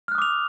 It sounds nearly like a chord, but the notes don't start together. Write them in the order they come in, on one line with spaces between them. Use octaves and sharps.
F6 F#6 D#6 D6 F7